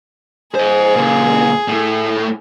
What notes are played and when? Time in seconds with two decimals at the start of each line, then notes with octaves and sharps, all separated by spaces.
0.55 G#4 C5 D#5
0.95 C#2 A#2
1.68 A2 A3